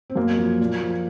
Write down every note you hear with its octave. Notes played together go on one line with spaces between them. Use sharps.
C4
F#2 A#3
F3
A#2
F3